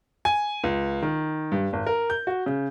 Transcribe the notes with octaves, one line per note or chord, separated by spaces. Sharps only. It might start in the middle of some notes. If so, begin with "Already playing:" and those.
G#5
C#2
D#3
G2
G#1
A#4
G6
F#4
C#3